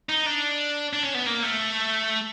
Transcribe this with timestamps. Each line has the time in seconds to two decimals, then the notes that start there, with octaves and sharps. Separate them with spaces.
0.09 D#4
0.26 D4
0.93 D4
1.03 C#4
1.15 B3
1.27 A#3
1.43 A3